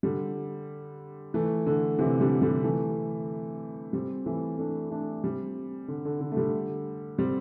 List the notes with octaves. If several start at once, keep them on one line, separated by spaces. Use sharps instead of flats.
D3 G3
E3 A3
D3
C3 E3
D3 G3
D3 G3
E3 A3
G3 C4
E3 A3
A3 D4
A3 D4
G3 C4
D3
D3
D3
A3
D3 G3
G3 C4